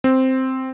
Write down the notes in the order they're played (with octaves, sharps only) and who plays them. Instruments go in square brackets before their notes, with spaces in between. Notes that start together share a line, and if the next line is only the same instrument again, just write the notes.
[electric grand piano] C4